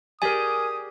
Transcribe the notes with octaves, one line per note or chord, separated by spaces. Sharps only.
G4 G#4 A#4 D5 G#5 D#6